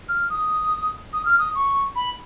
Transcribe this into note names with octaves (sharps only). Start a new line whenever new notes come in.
F6
D#6
D#6
F6
D#6
C#6
B5